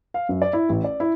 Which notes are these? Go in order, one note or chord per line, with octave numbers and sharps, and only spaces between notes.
F5
F#2
D5
E4
A1
D5
E4